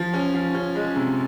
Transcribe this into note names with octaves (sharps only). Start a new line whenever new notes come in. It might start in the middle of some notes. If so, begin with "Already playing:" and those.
Already playing: F3
C#4
F3
C#4
G#3
C3